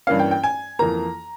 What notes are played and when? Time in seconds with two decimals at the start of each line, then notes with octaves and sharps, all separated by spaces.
0.07 G2 E3 A#3 C#4 F5
0.19 G5
0.31 G5
0.44 G#5
0.79 F2 E3 A#3 A#5